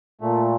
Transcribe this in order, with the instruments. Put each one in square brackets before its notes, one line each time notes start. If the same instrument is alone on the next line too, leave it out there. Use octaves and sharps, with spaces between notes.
[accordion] A#2 A3